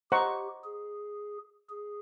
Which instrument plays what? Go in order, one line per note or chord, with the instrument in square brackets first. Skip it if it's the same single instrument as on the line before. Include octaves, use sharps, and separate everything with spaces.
[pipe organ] G4 [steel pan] C5 D#5 F#5 A#5 C#6
[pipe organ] G#4
G#4